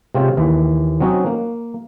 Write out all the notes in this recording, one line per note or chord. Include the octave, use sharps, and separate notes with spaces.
C3 G#3 C4 C#4 F4
D#2 E3
F#3 C4 C#4 D#4 F#4
A#3